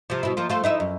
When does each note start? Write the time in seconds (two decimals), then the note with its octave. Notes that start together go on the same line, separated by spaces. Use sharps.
0.10 C3 F3
0.23 B2 E4
0.37 F3 A#3 F4
0.49 A3 F4 C5
0.64 D#4 E4 E5
0.80 F#2